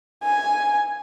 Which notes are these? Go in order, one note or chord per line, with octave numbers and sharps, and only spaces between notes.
G#5